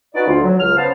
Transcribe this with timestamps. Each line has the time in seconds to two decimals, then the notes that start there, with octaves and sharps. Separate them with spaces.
0.14 C#4 D#4 F#4 B4 D5
0.27 D2 F4
0.43 F#3
0.60 C#2 F6
0.76 C#3 B3 C5 A5